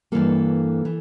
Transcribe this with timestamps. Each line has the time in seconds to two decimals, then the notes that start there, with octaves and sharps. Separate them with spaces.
0.12 G2 E3 A#3 A4
0.85 E3